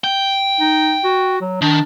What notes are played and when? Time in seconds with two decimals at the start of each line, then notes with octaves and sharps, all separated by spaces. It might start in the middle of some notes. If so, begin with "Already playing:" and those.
0.04 G5
0.60 D#4
1.05 F#4
1.41 F#3
1.62 D#3 D4